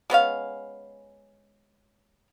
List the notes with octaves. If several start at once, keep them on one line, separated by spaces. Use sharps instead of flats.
G#3 B3 C#4 F5